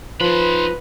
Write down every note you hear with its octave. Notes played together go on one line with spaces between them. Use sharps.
F3 D#4 B4 B5 C6